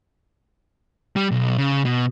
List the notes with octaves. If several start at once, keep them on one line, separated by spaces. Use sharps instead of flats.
G3
B1
C#3
B2